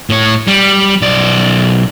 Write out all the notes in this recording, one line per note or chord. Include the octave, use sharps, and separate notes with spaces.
A2 C#5
G3
B1 D5